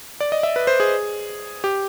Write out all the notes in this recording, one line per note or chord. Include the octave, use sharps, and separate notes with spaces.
D5
D#5
E5
B4
C5
G#4
G4